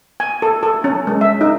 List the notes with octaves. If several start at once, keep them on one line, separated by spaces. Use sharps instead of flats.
G#5
A4
A4
C#4
G#3
E5
D#4